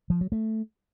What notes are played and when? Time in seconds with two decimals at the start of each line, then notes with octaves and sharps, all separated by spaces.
0.10 F3
0.21 F#3
0.32 A3